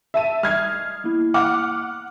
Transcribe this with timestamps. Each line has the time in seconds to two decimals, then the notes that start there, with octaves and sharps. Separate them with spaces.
0.14 E5 A5 D#7
0.43 G3 D#5 D#6 F6 G#6 C7
1.04 A#3 B3 E4
1.34 F#5 D6 F6